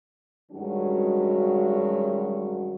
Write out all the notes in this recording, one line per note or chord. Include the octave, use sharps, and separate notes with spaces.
G2 D#3 F#3 G#3 C#4 F#4